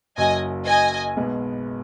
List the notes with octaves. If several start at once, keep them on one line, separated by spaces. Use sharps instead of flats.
F#1 F#2 F#3 D#5 G#5
D#5 G#5
B1 B2 G#3 B3